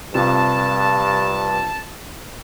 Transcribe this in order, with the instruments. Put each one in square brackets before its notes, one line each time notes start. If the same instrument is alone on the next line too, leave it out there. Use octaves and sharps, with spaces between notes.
[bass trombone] G2 [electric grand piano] C3 F4 E7 [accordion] A5